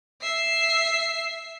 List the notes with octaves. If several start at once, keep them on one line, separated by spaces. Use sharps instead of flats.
E5 C7